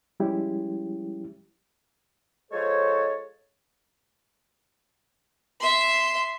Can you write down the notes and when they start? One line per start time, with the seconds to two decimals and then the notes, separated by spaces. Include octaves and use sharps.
0.20 F3 G3 G#3 C#4 E4 G4
2.51 F3 G#3 A4 C5 C#5
5.60 E5 C6